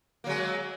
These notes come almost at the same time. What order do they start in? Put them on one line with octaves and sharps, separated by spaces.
A#3 F#3 G#3